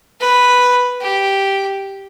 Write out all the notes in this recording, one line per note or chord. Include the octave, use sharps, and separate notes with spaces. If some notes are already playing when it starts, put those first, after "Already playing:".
B4
G4